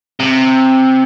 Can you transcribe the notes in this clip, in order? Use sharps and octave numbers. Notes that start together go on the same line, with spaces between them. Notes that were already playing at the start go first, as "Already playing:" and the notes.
C3